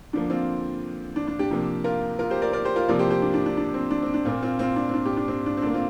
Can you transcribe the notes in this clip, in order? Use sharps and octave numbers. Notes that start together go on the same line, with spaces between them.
D3 F3 A#3 D4
C4 F4
D4
D4
D4 G4
C3 F3 A#3
F4 A#4
F4 A#4
G4 C5
A#4 D5
A#4 D5
G4 C5
F4 A#4
C3 F3 A#3 A#4 D5
G4 C5
G4 C5
D4
D4
D4
D4
C4
D4
C4
D4
A#2 A#3 C4 F4
C4 F4
C4 F4
D4
C4
D4
D4 G4
D4
C4
D4
C4
D3 A#3 D4
C4 F4